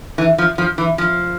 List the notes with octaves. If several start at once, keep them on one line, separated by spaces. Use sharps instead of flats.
E3
F3
F3
E3
F3